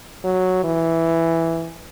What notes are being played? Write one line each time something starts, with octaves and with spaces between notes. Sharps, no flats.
F#3
E3